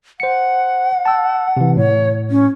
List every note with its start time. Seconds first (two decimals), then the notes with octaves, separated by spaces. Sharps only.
0.20 C5 F#5 C#7
1.05 A5 E6
1.57 C3 E3
1.77 A2 C#5
2.31 C#4